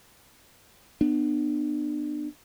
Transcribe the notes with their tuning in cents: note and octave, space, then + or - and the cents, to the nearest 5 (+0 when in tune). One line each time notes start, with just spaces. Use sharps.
B3 +0 D4 +30